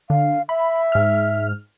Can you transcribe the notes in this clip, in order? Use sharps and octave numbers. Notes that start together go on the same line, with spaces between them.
D3 F5
E5 B5
G#2 F6